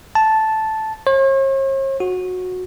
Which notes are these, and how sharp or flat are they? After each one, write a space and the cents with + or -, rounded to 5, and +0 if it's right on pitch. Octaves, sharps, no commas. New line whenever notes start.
A5 -5
C#5 -45
F#4 -15